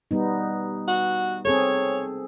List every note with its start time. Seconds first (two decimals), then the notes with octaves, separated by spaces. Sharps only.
0.11 G3 B3 D#4
0.88 F#4
1.45 C4 G#4 A4 C#5